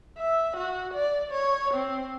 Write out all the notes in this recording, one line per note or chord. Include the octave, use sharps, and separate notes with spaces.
E5
F#4
D5
C#5
C4